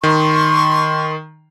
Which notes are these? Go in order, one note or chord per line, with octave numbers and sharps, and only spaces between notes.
D#3 C6 C#6